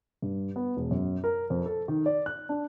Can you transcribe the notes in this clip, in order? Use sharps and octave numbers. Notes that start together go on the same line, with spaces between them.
G2
B3
E1
F#2
A#4
F2
A4
D#3
D5
F#6
D4